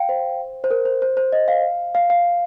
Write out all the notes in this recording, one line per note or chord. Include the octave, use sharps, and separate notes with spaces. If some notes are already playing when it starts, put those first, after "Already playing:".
Already playing: F5 G5
C5
C5
A#4
C5
C5
C5
D#5
F5
F5
F5